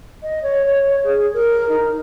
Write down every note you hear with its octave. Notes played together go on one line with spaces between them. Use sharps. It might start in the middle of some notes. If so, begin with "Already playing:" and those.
D#5
C#5
C#5
G#4
A#4
D#4